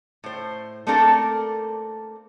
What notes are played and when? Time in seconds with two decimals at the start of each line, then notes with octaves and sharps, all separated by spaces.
0.24 A2 C5
0.87 A3 A#3 C4 D4 A4 A#4